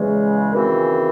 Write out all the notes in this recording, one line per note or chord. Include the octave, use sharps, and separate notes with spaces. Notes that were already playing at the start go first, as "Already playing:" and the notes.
Already playing: E2 C#3 G#3
D#2 C#3 E3 C4 F#4